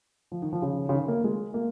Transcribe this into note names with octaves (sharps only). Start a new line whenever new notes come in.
F3
D#3
F3
C#3
C#3
D#3
A#3
G#3
A#3